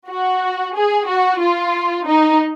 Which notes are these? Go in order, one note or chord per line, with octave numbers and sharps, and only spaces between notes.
F#4
G#4
F#4
F4
D#4